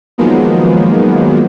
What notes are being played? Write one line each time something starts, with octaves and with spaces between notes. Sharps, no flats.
D#3 F3 F#3 G#3 A#3 B3